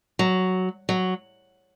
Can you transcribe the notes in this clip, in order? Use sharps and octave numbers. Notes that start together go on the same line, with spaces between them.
F#3
F#3